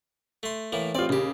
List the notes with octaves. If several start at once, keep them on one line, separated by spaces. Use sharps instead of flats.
A3 C6
A2 E3 A#3
A1 C4 F4 D5
D#2 C#3 G4